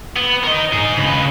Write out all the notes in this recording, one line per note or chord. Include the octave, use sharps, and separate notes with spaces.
B3
A#4 D#5
D#4 G#4
C#3 B4